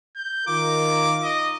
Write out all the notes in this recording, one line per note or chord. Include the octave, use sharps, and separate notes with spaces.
G6
D#3 F4 A#4 D6
D#5